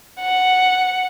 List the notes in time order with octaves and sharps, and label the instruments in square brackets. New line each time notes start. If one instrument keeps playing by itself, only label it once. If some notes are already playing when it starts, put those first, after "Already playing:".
[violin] F#5